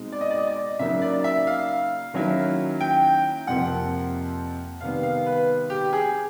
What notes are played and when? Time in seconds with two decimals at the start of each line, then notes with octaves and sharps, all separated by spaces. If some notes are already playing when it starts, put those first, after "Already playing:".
Already playing: B2 G#3 C4 D#4
0.12 D5
0.21 D#5
0.31 D5
0.38 D#5
0.47 D5
0.79 C#3 F#3 A#3 D#4 E5
1.02 D5
1.24 E5
1.47 F5
2.14 D#3 F#3 A#3 C#4 E4
2.81 G5
3.47 F2 C3 F3 A#3 F#5
4.81 C3 D#3 G3 B3 F5
5.03 F5
5.26 B4
5.70 G4
5.93 G#4